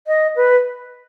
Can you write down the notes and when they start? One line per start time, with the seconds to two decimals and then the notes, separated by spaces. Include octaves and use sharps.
0.07 D#5
0.36 B4